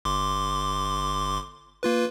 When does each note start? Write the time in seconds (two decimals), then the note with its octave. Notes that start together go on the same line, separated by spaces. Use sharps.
0.05 G1 C6 D6
1.83 A#3 F4 B4